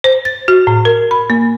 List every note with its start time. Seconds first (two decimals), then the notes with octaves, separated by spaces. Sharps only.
0.04 C5
0.25 A6
0.48 F#4
0.67 A2
0.85 A#4
1.11 B5
1.30 A#3